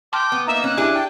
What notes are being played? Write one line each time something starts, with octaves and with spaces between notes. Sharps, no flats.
G5 A5 C6 D6 F6
B3
A#3 D#4 E5 A#5
C#4 F#6
D4 E4 G4 G#4
G5 A5